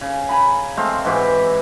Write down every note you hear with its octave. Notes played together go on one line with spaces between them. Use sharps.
C#3
G#5 A#5 B5
G#3 A3 C4 F5
G#2 E3 F#4 G4